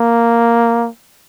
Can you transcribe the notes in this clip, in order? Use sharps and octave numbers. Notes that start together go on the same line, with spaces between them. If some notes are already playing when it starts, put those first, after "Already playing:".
Already playing: A#3